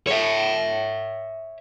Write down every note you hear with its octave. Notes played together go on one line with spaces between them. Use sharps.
C#5 E5